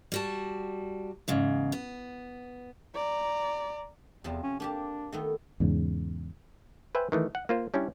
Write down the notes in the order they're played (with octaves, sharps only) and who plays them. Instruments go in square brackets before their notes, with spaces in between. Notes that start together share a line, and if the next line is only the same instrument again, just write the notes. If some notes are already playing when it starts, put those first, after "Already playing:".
[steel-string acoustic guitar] G3 F#4 A5
E2 G#2 C#3
B3
[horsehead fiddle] D5 A#5
[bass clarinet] E2 [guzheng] C3 F3 A5
[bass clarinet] C#4
[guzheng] A#3 G4 A5 [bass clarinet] D4
[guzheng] D#3 A3 B3
[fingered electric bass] E2 G#2 C#3
[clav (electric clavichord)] B4 C5 E5 G5 G#5
D#3 E3 A3
F#5
A#3 F4 C5
G3 C#4 D4 E4 G4